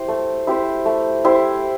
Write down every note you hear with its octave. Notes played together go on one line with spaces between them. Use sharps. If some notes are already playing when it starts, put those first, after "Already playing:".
Already playing: E4 G4 C5
A3
E4 G4 C5
A3
E4 G4 C5